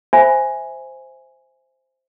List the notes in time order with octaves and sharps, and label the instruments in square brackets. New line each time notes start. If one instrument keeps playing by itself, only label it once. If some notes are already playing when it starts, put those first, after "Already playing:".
[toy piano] C5 E5 G#5 B5